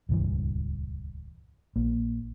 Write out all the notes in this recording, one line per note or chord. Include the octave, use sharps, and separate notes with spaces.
D#1 C#2 G2 E3
A#1 A#3